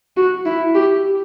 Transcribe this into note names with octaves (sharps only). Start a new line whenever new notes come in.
F#4
E4
G4